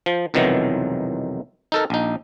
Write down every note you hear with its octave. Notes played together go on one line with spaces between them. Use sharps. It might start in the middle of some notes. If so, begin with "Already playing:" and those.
F3
C2 F2 B2 D#3 E3 F#3
D#4 A4 A#4
A#1 D#4